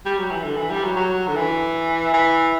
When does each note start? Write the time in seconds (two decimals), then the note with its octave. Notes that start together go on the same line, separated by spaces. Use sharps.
0.06 G3
0.18 F#3
0.31 E3
0.43 D3
0.57 E3
0.70 G3
0.83 F#3
0.97 F#3
1.28 D3
1.36 E3
2.14 E3